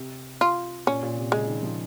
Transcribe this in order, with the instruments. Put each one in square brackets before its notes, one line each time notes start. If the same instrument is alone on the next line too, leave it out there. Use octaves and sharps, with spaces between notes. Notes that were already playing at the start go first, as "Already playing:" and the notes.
Already playing: [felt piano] C3
[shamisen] F4
[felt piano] A#2 [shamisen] C#4
[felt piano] A#2
C3
[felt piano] C#3 [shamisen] G#3
[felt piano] D#3
F3